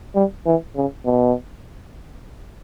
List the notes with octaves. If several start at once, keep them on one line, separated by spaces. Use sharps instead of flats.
G3
E3
C#3
B2